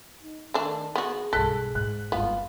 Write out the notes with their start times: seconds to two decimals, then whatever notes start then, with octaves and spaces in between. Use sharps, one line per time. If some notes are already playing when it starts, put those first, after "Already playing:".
0.23 D#4
0.54 D#3 A3 D4
0.96 B3 F#4 G#4
1.33 B1 G2 A4 F#6 B6
1.75 G#2 F#6
2.12 F#1 G2 B3 F4